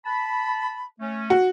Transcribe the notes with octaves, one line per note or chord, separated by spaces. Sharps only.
A5 B5
A3 C#4
F#4